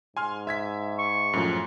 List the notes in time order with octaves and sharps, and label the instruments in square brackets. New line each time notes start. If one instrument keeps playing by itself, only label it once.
[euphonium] G#2 [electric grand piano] G#5 C6 F6
[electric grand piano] E5 G#6 B6
[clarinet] C#6
[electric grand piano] F#2 A2 F3